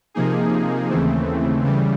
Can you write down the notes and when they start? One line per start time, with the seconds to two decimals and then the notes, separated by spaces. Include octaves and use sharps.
0.14 C3 F3 A#3 D#4 G#4
0.90 D#2 C#3 E3 A3 C4
1.64 C#3 E3 G3